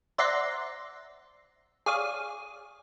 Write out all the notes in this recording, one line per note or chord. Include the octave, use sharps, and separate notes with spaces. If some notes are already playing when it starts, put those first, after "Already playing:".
C5 D5 E5 F#5 A#5 C6
G#4 C#5 D5 F5 D#6